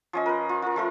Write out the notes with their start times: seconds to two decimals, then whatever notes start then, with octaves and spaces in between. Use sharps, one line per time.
0.13 F3 C#4 D#5
0.26 A#4 B4
0.49 F4
0.62 F4 A#4
0.76 F3 A3 A#4